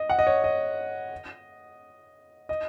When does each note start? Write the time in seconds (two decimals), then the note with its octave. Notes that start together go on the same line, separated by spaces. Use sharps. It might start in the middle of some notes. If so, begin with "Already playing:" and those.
Already playing: D#5
0.10 F#5
0.19 D#5
0.27 C#5
0.44 D#5
2.49 D#5